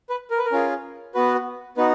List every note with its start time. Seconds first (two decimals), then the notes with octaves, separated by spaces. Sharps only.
0.10 B4
0.31 A#4
0.38 B4
0.46 A#4
0.52 C#4 F4 G#4
1.15 B3 F#4 B4
1.77 B3 D#4 F#4 B4